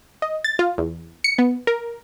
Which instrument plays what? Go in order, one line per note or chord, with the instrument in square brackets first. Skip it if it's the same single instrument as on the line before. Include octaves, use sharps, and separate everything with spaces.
[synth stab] D#5
A6
F4
E2
C#7
B3
A#4